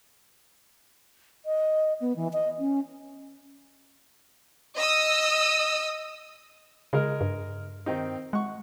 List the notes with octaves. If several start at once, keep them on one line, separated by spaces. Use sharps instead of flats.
D#5
B3
E3
D#5
C#4
D#5 D#6 E6
C#3 G#3 A#4
G2
D#3 C4 D#4
G#3 F#5 C#6